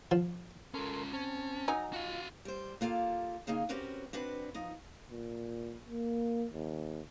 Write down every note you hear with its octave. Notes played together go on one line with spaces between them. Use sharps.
F3
C#4 F4 A4 A#4 C6
C4 C#4 A5
F#3 D#4 G#5 A#5
F4 F#4 F5
G3 C5
A#3 F4 G4 A4
C#3 A#3 D#4 G#4
C4 C#4 F#4 G4 A#4 B4
C4 D4 F#4 B4
F3 D#4
A#2
A#3
D#2